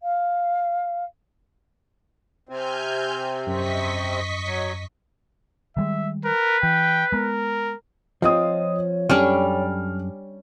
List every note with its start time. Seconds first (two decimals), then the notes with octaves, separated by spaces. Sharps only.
0.01 F5
2.49 C3 C4 G#5 F6 G6
3.47 F#2 D#5 C#6 B6
4.46 F#3
5.77 D#3 G3 G#3 E5
6.25 A#4 B4
6.63 E3 G5
7.12 G#3 B3 A#4
8.22 F3 C4 F4 C#5 D#5 D#6
9.10 F#2 G3 C#4 D4 A4 G#5 F6